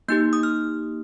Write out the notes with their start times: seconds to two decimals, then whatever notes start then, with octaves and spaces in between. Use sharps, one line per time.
0.08 A#3 D#4 G4 G6
0.33 D#6
0.43 F6